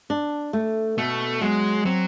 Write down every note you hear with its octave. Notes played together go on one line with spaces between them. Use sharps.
D4
A3
B2 A3
F#3 G#3
F#3 C4